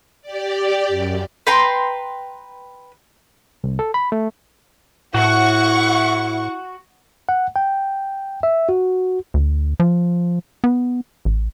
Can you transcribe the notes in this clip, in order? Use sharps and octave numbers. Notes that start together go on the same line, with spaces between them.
G4 D5
F#2
B4 G5 A#5 C6
C2
A4
B5
A3
A2 E4 F#4 F#5 C#6
F#5
G5
E5
F#4
D2
F3
B3
A1